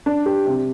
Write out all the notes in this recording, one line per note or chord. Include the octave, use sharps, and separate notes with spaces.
D4
G4
C3